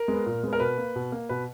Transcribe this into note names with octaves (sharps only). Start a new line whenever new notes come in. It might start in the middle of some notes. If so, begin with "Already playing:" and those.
Already playing: A#4
G#3 B3
A#2
G#3 B3
A#4
B2 B4
A#3
B2
A#3
B2 B4